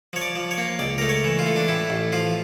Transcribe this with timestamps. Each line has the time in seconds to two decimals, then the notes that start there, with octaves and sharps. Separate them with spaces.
0.13 F3 C#5
0.22 D5
0.35 F3
0.51 C#5
0.58 A#3
0.79 C#2 D5
0.98 A3 A#4
1.09 C#5
1.24 E3
1.39 F4
1.46 A3
1.56 D4
1.68 A2 E4
1.90 A1
2.12 F3 F4